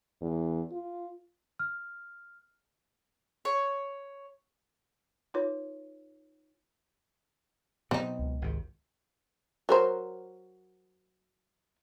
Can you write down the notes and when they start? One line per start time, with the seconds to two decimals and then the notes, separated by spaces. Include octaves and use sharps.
0.21 E2
0.72 F4
1.59 F6
3.45 C#5
5.34 D#4 F4 B4 C#5
7.91 B2 F#3 B3 C4 D#4
8.19 C#2
8.42 G#1 C3
9.69 F#3 A#4 C5